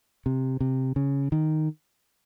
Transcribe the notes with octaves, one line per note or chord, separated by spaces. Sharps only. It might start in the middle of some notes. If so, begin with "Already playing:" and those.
C3
C3
C#3
D#3